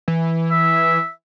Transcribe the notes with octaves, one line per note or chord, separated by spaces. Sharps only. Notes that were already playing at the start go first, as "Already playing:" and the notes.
E3
E5